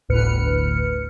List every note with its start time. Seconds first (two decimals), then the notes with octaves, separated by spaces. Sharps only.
0.09 G1 D2 A2 B4 F6 C#7